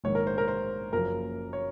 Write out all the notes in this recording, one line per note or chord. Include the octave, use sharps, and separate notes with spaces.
A#1 G#2 D#3 C#5
A#4
C5
A#4
C5
F#1 F#2 F3 A#3 A#4
C#5